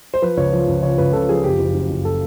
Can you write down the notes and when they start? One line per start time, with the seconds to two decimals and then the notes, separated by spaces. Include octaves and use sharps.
0.14 C5
0.22 F3 B4
0.37 C#2 C#5
0.53 F3
0.68 C#2
0.83 C#3 C#5
0.98 C#2 B4
1.13 C#3 A4
1.29 F3 G#4
1.43 F#1 G4
1.59 F#1
1.74 F#2
1.90 F#1
2.05 A4